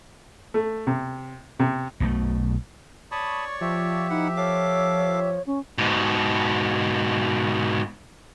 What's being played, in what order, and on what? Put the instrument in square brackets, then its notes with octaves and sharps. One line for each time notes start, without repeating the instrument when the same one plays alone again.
[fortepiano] A3
C3
C3
[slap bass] B1 B2 F#3 A3
[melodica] C#5 D5 C#6 [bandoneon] A5 B5 D#6
[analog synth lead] F3 [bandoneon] G4 E5
[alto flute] D#4 [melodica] E4 F#5
[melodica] A4 F5 D6 [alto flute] C#5
[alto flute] C#4
[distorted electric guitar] G#2 B2